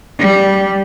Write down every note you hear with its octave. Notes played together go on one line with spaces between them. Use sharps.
G3